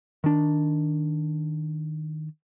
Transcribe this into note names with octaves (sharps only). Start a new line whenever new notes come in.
D#3 D4